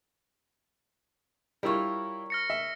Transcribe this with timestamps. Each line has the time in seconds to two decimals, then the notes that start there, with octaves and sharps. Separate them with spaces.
1.63 G3 E4 F4 A#4 C#5
2.30 F6 A#6 C#7
2.50 E5